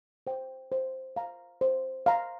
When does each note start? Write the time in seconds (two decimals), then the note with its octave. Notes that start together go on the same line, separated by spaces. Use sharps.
0.27 C5 G5
0.72 C5
1.16 F5 A#5
1.61 C5
2.06 F5 A#5